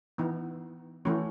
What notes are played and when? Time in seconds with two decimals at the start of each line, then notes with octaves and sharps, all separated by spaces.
0.18 E3 B3 D#4
1.05 E3 A3 C#4 F#4